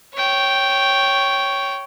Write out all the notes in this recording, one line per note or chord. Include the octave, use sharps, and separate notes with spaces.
C#5 G5